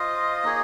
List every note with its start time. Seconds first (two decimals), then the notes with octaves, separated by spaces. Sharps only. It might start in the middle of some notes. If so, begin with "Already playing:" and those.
Already playing: F4 C5 D#5 F5
0.43 A#3 D#4 G#4 C#5